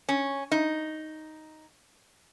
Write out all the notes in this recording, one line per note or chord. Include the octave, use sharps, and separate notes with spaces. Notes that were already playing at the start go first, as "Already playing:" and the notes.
C#4
D#4